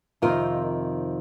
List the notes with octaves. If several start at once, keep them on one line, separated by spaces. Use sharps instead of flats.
F2 C3 D#3 C4 D#4 F4 A#4